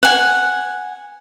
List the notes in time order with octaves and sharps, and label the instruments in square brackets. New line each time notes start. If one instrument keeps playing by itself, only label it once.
[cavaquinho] F#5 G#5